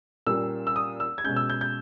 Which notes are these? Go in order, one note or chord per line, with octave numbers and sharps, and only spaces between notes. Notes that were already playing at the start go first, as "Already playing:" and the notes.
A#2 G3 A#3 C#4 E6
E6
D#6
E6
G#6
B2 G#3 C#4 G6
E6
G6
G6